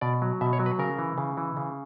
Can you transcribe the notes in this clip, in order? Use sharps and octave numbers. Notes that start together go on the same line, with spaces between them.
B2 D5
F#3
B2 E5
C#5
F#3
B4
C#3 A#4
E3
C#3
E3
C#3